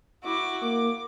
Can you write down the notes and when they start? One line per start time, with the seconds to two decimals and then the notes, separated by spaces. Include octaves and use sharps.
0.23 E4 F#4 D6
0.62 A#3 D6